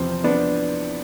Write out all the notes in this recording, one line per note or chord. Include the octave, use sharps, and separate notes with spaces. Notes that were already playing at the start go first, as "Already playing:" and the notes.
Already playing: E2 C3 F3 C4
B3 D4